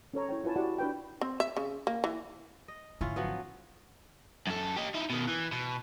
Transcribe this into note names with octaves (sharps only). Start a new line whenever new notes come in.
C#4 A4 C#5 A#5
E4 C#5 G5
E4 F4 B4 G#5 A5
E4 F#4 G4 D5 F#5
D4 B4 G5
C4
E5
C#3
A#3
E3
D#5
G#1 D3 C#4 E4 F4
F3 F#3 B3
F#2 A4
G4 D#5
D#4 E4
B2 D#3
E3
B2